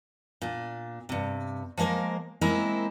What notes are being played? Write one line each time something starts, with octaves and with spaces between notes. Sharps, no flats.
A#2 D4
G2 C3
F3 G#3 A#3 A#4 C5
G#3 A#3 C4 E4 A#4 C5